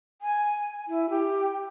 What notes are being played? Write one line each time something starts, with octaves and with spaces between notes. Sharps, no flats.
G#5
E4
G4